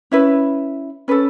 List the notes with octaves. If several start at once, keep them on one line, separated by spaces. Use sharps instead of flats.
C#4 E4 B4
C#4 A4 B4